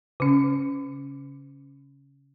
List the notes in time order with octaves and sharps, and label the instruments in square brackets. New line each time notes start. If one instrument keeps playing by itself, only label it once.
[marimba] C#3 C#4